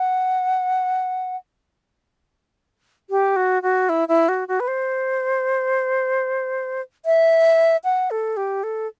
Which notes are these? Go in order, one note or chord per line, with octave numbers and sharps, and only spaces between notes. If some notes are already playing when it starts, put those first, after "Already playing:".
Already playing: F#5
G4
F#4
F#4
E4
E4
F#4
F#4
B4
C5
E5
F#5
A4
G4
A4